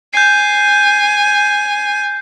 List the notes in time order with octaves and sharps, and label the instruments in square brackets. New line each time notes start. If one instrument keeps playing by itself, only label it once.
[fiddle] G#5 [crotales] G6 C7